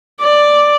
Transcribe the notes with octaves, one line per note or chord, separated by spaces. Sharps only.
D5